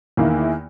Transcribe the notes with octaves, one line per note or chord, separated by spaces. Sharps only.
E2 D#3 A#3 E4